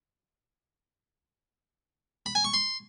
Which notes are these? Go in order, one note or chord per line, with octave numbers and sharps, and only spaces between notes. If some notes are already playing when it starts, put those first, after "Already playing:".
B5
G#5
C#6
C6